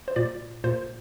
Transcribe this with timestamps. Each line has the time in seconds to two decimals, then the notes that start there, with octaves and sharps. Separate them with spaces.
0.08 C5
0.16 A#2 D5
0.64 A#2 C5